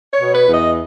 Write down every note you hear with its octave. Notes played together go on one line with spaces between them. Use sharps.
C#5
B2
B4
E2
D#5